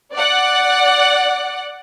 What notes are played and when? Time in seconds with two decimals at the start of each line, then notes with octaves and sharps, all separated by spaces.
0.15 D5 F#5